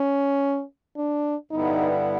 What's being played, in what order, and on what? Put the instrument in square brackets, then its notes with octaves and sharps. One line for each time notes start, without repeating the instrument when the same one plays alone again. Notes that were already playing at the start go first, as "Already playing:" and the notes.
Already playing: [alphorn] C#4
D4
[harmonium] G2 D3 G3 B3 E4 [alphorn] D#4